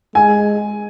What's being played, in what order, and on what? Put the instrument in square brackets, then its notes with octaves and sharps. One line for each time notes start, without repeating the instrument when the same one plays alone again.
[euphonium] G#3 [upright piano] G#5